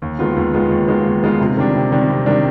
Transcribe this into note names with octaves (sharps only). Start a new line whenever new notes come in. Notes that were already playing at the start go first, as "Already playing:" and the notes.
D#2
D#3 G#3 B3 F4
D#2
D#3 G#3 B3 F4
D#2
D#3 G#3 B3 F4
D#2
D#3 G#3 B3 F4
C3
D#3 G3 D4
C3
D#3 G3 D4
C3
D#3 G3 D4